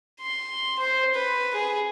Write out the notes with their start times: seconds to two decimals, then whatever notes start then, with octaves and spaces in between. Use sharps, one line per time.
0.21 C6
0.79 C5
1.15 B4
1.55 G#4